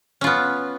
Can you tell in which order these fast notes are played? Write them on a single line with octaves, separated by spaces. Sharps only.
C#4 F4 B3